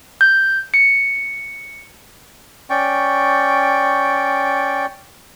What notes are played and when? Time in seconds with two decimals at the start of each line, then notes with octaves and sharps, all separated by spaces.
0.21 G6
0.74 C#7
2.70 C#4 D5 G5 C#6